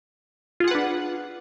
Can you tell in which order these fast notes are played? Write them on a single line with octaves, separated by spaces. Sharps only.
F4 G#4 F#5 B4 D4